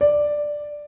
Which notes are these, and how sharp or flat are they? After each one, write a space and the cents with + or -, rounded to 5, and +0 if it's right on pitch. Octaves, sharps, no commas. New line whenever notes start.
D5 +5